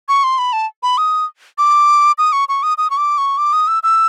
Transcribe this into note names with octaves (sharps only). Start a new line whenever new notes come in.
C#6
C6
B5
A5
B5
D#6
D6
D#6
C#6
C#6
D#6
D#6
C#6
D6
C#6
D6
D#6
E6
E6